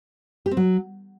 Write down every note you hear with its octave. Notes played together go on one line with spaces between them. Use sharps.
G4
C4
F#3